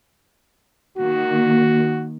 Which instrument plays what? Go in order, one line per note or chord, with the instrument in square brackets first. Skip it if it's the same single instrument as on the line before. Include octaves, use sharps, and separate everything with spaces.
[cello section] D#3 A#3 [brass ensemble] F#4